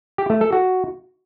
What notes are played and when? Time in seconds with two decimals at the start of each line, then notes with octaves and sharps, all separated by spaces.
0.18 G4
0.30 A3
0.41 A4
0.53 F#4